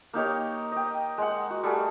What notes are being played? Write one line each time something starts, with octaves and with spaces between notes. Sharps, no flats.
A#3 D#4 G4 C#5
D#5 G5
G#3 F#5
F#4
G3 A3 G#4